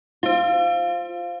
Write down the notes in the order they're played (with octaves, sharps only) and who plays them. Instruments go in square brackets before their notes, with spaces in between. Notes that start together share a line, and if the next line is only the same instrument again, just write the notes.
[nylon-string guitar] F4 [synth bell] C5 F5